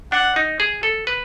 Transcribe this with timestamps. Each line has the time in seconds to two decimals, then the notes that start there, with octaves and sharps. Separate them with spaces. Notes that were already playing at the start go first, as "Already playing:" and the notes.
0.12 D4 F#5
0.36 D#4
0.60 G#4
0.83 A4
1.07 B4